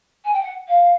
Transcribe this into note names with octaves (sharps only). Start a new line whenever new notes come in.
G#5
G5
F#5
F5